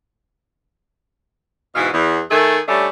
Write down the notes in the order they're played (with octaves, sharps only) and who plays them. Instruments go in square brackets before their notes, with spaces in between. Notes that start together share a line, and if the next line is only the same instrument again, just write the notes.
[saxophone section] G#2 B2 E3 B3 F5
E2
D#3 A3 G#4 A4
G3 A3 C#4 D4 E5